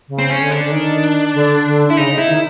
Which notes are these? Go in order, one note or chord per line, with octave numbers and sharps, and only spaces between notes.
C#3
C4
C#4
D3
D4
D3
D#3
D3
D3
E4
C#3 D#4
E4
D#3